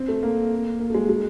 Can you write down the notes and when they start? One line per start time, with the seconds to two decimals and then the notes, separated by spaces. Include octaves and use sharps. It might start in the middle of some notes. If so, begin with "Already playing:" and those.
Already playing: C4
0.08 A3
0.23 A#3
0.80 A#3
0.90 A3
0.94 G#3
1.09 G#3